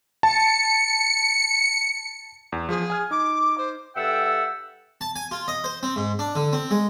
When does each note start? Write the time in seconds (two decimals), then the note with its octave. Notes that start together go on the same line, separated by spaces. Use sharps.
0.23 A5 C#7
2.52 E2
2.69 F3 G#4
2.90 G#5 F6 G#6
3.11 D#4 D6
3.57 C5
3.96 G2 A4 E5 F#5 G5 E6
5.01 A5
5.16 G#5
5.31 F4
5.48 D#5
5.64 C5
5.83 C4
5.96 G#2
6.19 D4
6.35 D3
6.53 C4
6.71 G#3